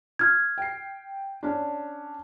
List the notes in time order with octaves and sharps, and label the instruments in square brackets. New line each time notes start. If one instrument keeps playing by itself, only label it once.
[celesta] F6 G#6
[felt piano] G5 C7
C#4 D4